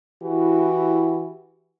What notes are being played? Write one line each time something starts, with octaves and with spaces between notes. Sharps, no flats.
E3 E4 F#4 G4